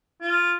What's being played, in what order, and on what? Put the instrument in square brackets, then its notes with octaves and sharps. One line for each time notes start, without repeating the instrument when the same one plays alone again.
[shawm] F4